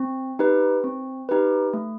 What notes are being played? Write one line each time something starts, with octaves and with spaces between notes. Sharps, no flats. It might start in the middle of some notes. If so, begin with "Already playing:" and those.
Already playing: C4
D#4 G4 B4
C4
D#4 G4 B4
A3